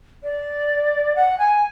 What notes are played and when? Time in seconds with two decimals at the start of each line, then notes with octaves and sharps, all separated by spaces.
0.24 D5
1.16 F#5
1.38 G#5